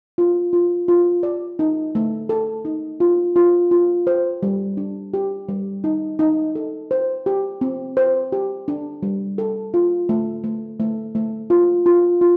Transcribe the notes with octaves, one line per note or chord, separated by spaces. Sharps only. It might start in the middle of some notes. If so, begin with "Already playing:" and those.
F4
F4
F4
D5
D#4
A3
A4
D#4
F4
F4
F4
C5
G3
D4
G4
G3
D#4
D#4
A4
C5
G4
C4
C5
G4
D4
G3
A4
F4
A3
A3
A3
A3
F4
F4
F4